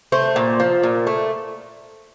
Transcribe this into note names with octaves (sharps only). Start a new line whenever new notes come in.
A3 C5
A#2
F3
A#2
A3